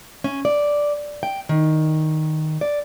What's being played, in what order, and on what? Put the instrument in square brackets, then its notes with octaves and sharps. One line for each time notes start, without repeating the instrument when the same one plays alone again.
[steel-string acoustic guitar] C#4
D5
G5
D#3
D5